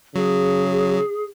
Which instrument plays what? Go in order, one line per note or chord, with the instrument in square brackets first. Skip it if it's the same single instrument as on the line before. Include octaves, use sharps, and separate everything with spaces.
[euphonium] C#3 [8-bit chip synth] F#3 [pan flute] G#4